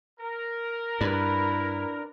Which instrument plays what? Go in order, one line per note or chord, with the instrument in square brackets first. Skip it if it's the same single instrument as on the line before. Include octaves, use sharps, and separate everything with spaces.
[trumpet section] A#4
[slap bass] G2 [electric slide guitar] D4 B4 [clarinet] E4